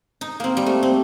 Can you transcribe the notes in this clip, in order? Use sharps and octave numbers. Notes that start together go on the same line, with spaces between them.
D#4
A#3 C4
G3
A3
C4